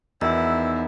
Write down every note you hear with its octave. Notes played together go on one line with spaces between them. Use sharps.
E2 B2 D#3 E4 E6